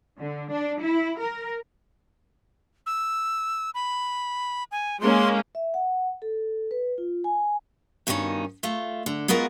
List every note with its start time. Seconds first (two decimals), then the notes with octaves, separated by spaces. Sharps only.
0.19 D3
0.51 D4
0.81 E4
1.20 A#4
2.86 E6
3.74 B5
4.72 G#5
5.01 G#3 A#3 C#4 C6
5.55 E5
5.74 F#5
6.22 A4
6.71 B4
6.98 F4
7.24 G#5
8.07 G2 B2 D#3 B3 C#4 D#4
8.63 A3 F4
9.06 D3
9.28 G#3 B3 F4 F#4 A#4